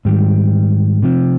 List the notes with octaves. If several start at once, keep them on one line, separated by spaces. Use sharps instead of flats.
G#2 D#3 G3
C3 F3 C4